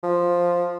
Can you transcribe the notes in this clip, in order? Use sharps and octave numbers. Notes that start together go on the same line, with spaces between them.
F3